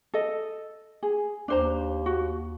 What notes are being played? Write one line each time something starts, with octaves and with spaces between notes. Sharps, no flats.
A4 D#5
G#4
D#2 D4 C5 A#5
F#4